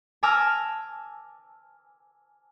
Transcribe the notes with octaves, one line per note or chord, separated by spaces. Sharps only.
G#5 A5 D6 E6 F6 A#6